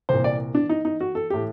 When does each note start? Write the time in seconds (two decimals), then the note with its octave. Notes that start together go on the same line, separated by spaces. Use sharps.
0.09 C2 A#2 C5
0.24 D5
0.55 D4
0.69 D#4
0.85 D#4
1.00 F#4
1.15 A4
1.30 A2 G4